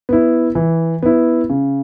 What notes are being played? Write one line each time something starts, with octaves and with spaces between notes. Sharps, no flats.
B3 E4
E3
B3 E4
C#3